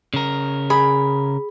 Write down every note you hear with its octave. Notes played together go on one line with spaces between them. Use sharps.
C#3 A#4
G#4 B5